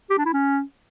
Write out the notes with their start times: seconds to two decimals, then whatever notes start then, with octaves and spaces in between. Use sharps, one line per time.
0.10 G4
0.18 D4
0.26 E4
0.33 C#4